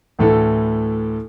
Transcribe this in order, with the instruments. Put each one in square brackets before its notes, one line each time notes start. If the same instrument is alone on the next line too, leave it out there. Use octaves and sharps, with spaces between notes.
[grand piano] D2 A2 E3 A4